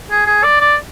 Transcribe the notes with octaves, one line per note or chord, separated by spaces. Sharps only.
G#4
G#4
D5
D5